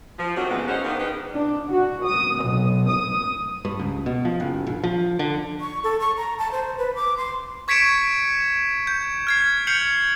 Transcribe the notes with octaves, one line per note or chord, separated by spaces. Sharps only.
F3
C3 D#3 F#3 A3 C4 F#4
C#3 E3 F3 G3 G#3 B3
A#3 C#4 D#4 F#4 G#4 C5
D#3 B3 D4
D#4 G4 G#4 B4
D4
F#4
D#6
B1
D#6
G2
C#2
B2
F3
F#1
A#1
F3
D3
C#6
A4
C#6
A#5
A5
C5
B4
D6
C6
C#6 G#6 B6 C#7 D7 E7
G6
F6 G#6 C7
F6 G6 C7 C#7 F7 F#7